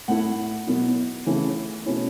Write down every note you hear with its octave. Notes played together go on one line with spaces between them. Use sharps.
A2 A3 E4 F#5
B2 F#3 B3 E4
C#3 E3 A3 C#4 E4
B2 A3 C#4 E4